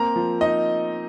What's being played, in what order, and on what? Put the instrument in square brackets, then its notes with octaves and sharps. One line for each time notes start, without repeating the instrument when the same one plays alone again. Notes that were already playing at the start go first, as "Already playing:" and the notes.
Already playing: [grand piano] A#3 C4 A#5
F3
D#4 D#5